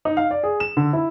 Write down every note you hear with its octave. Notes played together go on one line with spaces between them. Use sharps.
D#4
F5
D5
G#4
E7
D3
E4